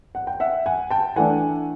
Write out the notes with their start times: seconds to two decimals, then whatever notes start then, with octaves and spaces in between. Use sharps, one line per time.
0.15 F#5
0.27 G5
0.40 E5 F#5
0.66 F#5 G#5
0.90 G5 A5
1.16 E3 A3 D4 F#5 G#5